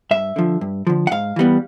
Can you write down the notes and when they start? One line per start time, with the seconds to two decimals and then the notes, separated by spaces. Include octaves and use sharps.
0.11 G2 E5
0.36 D3 F3
0.61 G2
0.87 D3 F3
1.07 F#5
1.11 G#2 F5
1.36 E3 G3 B3